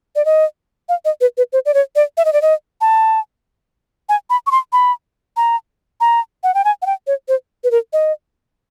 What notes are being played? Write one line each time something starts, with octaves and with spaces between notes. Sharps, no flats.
D5
D#5
F5
D#5
B4
B4
C5
D5
C#5
D5
E5
D#5
D5
D#5
A5
G#5
B5
C#6
C6
B5
A#5
A#5
F#5
G5
G#5
F#5
G5
C#5
C5
B4
A#4
D#5